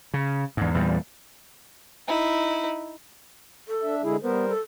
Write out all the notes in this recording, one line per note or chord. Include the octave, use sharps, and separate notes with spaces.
C#3
E2 G#2
E2 A#2 F#3 G3
D#4 E4
A4
D4 E5
D3 G#3 E4 G#4
G3 B3 A#4 C5
A4